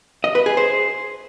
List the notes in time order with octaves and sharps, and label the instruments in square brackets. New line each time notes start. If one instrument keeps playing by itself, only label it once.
[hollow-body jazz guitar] D#5
B4
G#4
C5